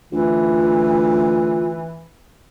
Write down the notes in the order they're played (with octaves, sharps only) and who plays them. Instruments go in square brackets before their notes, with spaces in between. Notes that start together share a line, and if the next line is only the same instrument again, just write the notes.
[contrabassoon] D2 [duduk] E3 [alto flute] F4